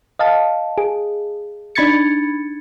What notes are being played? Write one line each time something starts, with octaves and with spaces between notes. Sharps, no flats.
D#5 F5 A5
G#4
D4 D#4 B5 G#6 A6 C#7